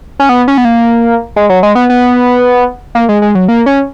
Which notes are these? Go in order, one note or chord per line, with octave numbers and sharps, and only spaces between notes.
C#4
B3
C#4
B3
A#3
G#3
F#3
G#3
B3
B3
A#3
G#3
G#3
F#3
A#3
C#4